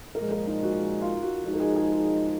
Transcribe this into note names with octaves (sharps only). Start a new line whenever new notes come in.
A#2 F3 G#3 A#4
A#4
D#4
F#4
F4
F#4
F3 G#3 D#4 F#4
A#4
G#4
G#4
G#4